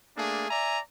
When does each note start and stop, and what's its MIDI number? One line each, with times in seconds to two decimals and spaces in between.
0.16 0.46 57
0.16 0.46 58
0.16 0.46 62
0.16 0.46 68
0.49 0.79 74
0.49 0.79 76
0.49 0.79 80
0.49 0.79 82